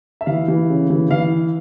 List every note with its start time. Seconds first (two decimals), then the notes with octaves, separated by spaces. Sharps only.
0.21 E5
0.26 E3 F5
0.48 E3
0.69 C#3
0.90 E3
1.10 E3 F5